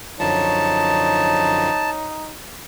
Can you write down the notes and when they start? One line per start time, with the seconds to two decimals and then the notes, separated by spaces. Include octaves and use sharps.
0.20 F#2 D3 F3 D#4 C#5 A5